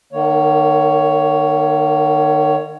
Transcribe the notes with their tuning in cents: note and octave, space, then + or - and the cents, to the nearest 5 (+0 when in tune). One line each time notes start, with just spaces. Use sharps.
D#3 -40 A#3 +0 C#5 +5